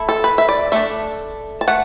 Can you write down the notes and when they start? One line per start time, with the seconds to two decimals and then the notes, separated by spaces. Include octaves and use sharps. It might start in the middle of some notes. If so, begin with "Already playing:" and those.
Already playing: A3 E4
0.09 A4
0.24 B4
0.38 E5
0.49 D5
0.72 A3 D4 E5
1.61 A5
1.68 A3 F#5